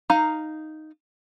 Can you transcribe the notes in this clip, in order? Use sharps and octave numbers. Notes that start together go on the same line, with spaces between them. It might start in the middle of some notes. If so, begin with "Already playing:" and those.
D#4 F5 A#5